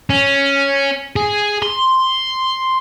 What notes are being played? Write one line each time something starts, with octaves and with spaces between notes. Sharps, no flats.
C#4
G#4
C6